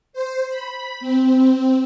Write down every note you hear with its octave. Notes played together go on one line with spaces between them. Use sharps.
C5
B5
C4